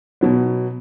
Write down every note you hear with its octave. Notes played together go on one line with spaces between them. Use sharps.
B2 F#3 B3